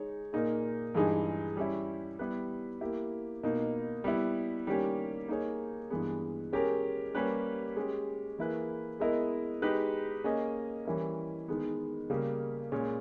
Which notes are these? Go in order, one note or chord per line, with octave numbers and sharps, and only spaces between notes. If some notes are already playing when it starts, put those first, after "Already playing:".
Already playing: G#3 D#4 G#4 C#5
A#2 A#3 D#4 G#4
G2 E3 G#3 D#4 G#4
G3 C#4 E4
G3 B3 E4 G4 B4
A#3 E4 G4
B2 A#3 D#4
G3 B3 E4
D#3 G3 A#3 C#4 G4
A#3 D#4 G#4 C#5
G2 E3 G#3 B3
G#3 C#4 G4 A#4
G3 A#3 C#4 G4 B4
G#3 C#4 G4
E3 A#3 E4 G#4 B4
G#3 B3 E4 A#4 D#5
G#3 D#4 G4 B4
A#3 C#4 G#4 D#5
E3 G3 C#4 E4 A#4
D#3 G#3 B3
C#3 G3 A#3
A#2 G#3 C#4